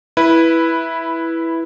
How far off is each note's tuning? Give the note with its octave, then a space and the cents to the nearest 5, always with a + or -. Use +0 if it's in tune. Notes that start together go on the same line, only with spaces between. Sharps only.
E4 +0 B4 -10